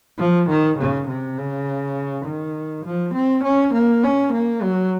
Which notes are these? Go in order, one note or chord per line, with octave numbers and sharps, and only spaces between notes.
F3
D#3
C#3
C3
C#3
D#3
F3
C4
C#4
A#3
C#4
A#3
F#3